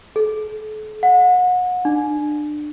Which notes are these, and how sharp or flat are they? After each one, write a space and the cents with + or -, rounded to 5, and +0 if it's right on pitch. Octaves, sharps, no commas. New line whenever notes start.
A4 -40
F#5 -30
D4 +25